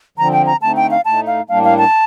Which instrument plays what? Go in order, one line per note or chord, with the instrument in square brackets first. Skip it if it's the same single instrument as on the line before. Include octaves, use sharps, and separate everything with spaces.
[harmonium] D3 F3 C4 [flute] A#5
[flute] G5
A#5
[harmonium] D3 A3 C4 D#4 [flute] A5
[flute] G5
F5
[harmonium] A2 A3 D#4 [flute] A5
[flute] F5
[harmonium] A2 G3 A#3 D4 [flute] F5
[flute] F5
A5